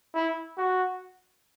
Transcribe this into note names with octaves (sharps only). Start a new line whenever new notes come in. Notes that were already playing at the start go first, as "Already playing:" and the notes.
E4
F#4